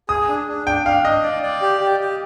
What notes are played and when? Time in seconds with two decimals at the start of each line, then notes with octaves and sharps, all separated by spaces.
0.09 G#4 D#6
0.28 D4
0.47 D4
0.66 D4 G5
0.86 D4 F5
1.04 D4 D#5
1.23 D5
1.43 D5
1.62 G4
1.81 G4
2.00 G4